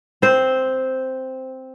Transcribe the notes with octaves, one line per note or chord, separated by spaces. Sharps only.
C4 C5